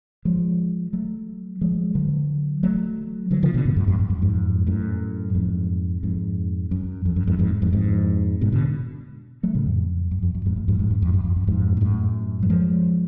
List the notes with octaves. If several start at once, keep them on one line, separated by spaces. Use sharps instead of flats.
F3 G#3
F#3 A3
F3 G#3
D3 F#3
F#3 A3
D3 F#3
C#3 F3
B2 D3
G#2 B2
F#2 A2
F2 G#2
F#2
F#2
F2 G#2
F#2 A2
F2 G#2
F2 G#2
F#2
F2
F#2
F2 G#2
F2 G#2
F2 G#2
F2 G#2
G#2 B2
B2 D3
F#3 A3
A2 C#3
F2
F#2
F2
F#2
F2 G#2
F#2 A2
F2 G#2
F2 G#2
F#2
F2
F#2
F2
F#2
F2 G#2
G#2
F#2 A2
F#3
F3 G#3